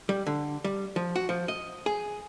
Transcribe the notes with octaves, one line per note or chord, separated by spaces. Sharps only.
G3
D3
G3
F3
F#4
F3
D#5
G#4